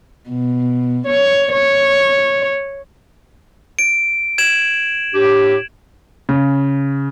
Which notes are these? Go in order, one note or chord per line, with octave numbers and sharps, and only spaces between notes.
B2
C#5
C#5
D7
G#6 E7 F#7
A2 D4 G4
C#3